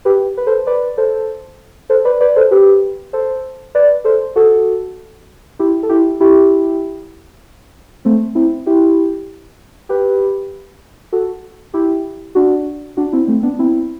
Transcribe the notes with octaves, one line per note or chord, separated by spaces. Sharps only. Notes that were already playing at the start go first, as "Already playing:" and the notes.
G4 B4
B4
A4 C5
B4 D5
A4 C5
A4 C5
B4 D5
B4 D5
A4 C5
G4 B4
A4 C5
B4 D5
A4 C5
F#4 A4
E4 G4
A4
E4 G4
E4 G4
A3 C4
C4 E4
E4 G4
G4 B4
F#4 A4
E4 G4
D4 F#4
D4 F#4
C4 E4
A3 C4
B3 D4
C4 E4